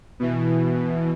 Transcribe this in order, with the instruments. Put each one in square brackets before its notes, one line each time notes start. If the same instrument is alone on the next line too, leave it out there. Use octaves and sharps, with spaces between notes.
[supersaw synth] B2 E3